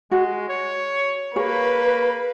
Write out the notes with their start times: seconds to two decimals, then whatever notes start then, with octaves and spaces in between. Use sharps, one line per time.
0.11 G#3 F#4
0.49 C#5
1.36 A#3 G#4 B4 C#5